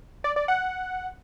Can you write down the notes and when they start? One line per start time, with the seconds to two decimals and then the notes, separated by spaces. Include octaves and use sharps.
0.24 D5
0.36 D5
0.48 F#5